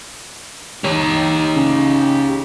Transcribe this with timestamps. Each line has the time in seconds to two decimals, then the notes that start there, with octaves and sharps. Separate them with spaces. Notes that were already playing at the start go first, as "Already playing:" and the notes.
0.84 D#4 G4 C#5
1.56 C#3